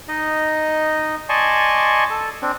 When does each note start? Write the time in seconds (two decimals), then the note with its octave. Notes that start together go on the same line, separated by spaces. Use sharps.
0.08 D#4 D#5
1.29 D5 D#5 G#5 A5 C6 C#6
2.10 A4
2.42 C4 D4